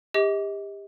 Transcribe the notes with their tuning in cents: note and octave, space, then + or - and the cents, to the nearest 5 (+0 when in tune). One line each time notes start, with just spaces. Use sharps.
G4 +30 D#5 +35 D6 -30